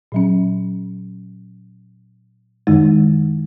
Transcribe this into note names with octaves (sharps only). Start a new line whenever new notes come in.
A#2 F#3 C#4
F#2 D#3 G#3 D#4